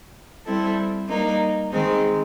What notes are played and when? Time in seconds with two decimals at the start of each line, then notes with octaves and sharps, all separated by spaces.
0.45 G3 C4 E4 A4
1.08 G3 A#3 D#4
1.72 D#3 G#3 C4 D#4